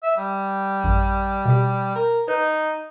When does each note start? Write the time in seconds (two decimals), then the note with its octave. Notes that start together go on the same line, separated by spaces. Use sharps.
0.03 E5
0.18 G3
0.84 A1 F#2
1.45 B2 G4
1.95 A#4
2.28 D#4 B4